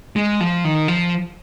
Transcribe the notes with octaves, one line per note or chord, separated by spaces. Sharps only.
G#3
F3
D#3
F3